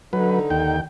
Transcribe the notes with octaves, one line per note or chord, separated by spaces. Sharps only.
D3 F#3 D#4 B4
D#2 G5